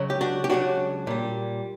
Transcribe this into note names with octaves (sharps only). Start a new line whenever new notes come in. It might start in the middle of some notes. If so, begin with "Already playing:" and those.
Already playing: C#2 C#3 F#3
G4
D4 F#4
G4
C#2 C#3 F#3 D4 F#4
A#2 G3